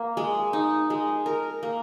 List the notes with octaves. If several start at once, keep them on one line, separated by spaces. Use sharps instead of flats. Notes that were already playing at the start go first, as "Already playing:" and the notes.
Already playing: A#3
G#3
D#4
G#3
A#4
A#3